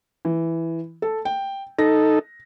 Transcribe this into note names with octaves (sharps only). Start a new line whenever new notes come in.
E3
A4
G5
D#4 A4 A#6